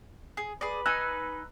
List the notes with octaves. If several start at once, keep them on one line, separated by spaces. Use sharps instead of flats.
G#4
G#4 B4 D5
D#4 G#5 E6 F#6